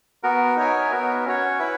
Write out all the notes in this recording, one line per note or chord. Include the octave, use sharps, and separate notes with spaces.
B3 F#4 A#4
D#4 A#4 C#5 E5 G#5
B3 F#4 A#4 E5
C#4 F#4 C#5
E4 B4 E5